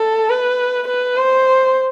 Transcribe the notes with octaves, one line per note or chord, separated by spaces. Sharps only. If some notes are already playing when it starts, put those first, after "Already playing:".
Already playing: A4
B4
B4
C5